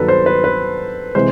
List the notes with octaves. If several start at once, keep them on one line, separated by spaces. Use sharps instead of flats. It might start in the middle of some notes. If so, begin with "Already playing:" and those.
Already playing: G2 D#3 F#3 B3 D#4 A4 B4
C5
B4
B4
C3 E3 G#3 C5